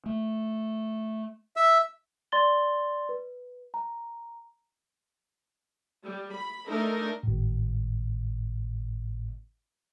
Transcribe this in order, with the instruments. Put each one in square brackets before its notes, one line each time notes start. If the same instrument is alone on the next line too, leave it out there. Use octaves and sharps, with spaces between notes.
[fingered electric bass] A3
[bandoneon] E5 E6
[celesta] D5 C6 A6 G7
B4
A#5
[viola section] G3
B5
A3 D4 D#4 A#4
[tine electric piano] G#1 A2